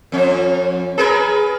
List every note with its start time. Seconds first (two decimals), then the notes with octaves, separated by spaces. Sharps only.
0.12 F2 C#4
0.98 G#4 A#4 B4